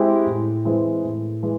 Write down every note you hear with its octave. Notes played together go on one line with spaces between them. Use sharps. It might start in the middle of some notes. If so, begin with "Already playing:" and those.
Already playing: G#3 C4 E4 G4
A2
E3 G#3 C4 E4
A2
E3 G#3